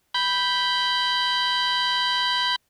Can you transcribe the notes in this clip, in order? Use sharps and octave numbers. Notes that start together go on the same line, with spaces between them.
B5 G6